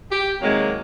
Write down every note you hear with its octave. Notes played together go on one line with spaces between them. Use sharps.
G4
C3 D#3 F#3 G#3 A#3